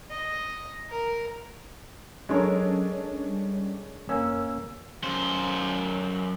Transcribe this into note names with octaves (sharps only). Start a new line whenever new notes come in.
D#5
A#4
F#3 G#3 C#4 D4 A4 A#4 C#5
G3
F#2 A#3 C#4 E6
F#2 C5